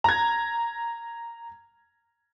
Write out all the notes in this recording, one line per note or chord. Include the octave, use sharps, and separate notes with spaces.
A#5 G#6